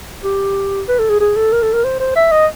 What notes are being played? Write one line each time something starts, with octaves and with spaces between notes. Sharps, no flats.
G4
B4
A4
G#4
G#4
A4
A#4
A4
A#4
C5
C5
E5
D#5